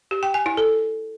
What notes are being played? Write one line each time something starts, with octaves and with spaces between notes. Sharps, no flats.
G4
G5
G#5
E4
A4